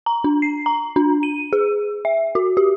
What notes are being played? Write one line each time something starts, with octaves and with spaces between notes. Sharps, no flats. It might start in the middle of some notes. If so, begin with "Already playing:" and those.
A#5
D4
C7
A#5
D4
D#7
G#4
E5
F#4
G4